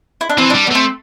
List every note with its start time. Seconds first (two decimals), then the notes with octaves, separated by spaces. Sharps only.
0.21 E4
0.30 D4
0.38 E3 C4
0.50 G3 D4
0.67 B3
0.71 A3 C4